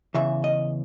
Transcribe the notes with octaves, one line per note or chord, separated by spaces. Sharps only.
E2 C#3 E3 E5
D#5